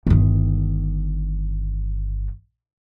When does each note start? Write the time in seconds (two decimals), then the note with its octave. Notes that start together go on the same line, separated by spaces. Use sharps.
0.07 G1 D#3